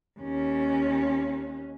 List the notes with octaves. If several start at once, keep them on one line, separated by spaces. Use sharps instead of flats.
D#2 C#4